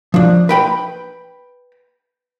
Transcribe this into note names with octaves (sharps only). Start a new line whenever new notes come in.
F3 D4
B4 G5 B5